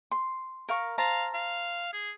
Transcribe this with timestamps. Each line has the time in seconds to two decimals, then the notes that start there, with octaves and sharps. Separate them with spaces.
0.12 C6
0.69 A#4 F5 C#6
0.98 C5 F5 A5 A#5
1.33 F5
1.93 G#4